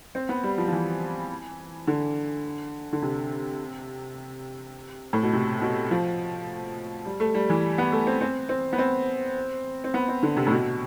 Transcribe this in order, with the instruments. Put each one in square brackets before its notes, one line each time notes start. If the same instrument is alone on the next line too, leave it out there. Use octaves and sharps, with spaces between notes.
[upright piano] C4
B3
G3
F3
F3
E3
D3
D3
C3
A2
B2
C3
B2
F3
G3
A3
G3
E3
B3
A3
C4
C4
C4
B3
C4
C4
B3
C4
D3
C3
A2
B2